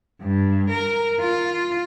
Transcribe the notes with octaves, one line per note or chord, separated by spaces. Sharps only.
G2
A#4
F4